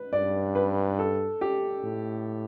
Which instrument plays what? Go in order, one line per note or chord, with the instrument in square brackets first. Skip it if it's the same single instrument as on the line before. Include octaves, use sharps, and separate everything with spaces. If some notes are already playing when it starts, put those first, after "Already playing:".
Already playing: [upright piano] B4
[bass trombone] G2 [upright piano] D5
[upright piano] B4
A4
G4
[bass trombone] A2